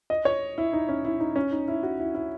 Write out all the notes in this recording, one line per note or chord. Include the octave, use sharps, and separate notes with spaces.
D#5
C#5
E4
D#4
C#4
E4
D#4
C#4
D#4
E4
F#4
E4
E4